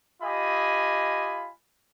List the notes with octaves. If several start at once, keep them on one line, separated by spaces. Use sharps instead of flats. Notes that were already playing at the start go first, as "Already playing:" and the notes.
F4 G4 D#5 G#5 B5